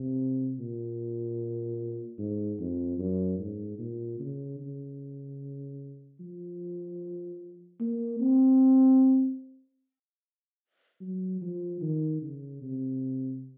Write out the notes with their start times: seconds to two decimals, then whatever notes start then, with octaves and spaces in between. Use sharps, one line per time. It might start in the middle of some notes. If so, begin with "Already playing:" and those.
Already playing: C3
0.59 A#2
2.18 G#2
2.60 F2
2.99 F#2
3.39 G#2
3.79 A#2
4.19 C#3
4.60 C#3
6.20 F3
7.80 A#3
8.20 C4
11.01 F#3
11.42 F3
11.81 D#3
12.22 C#3
12.62 C3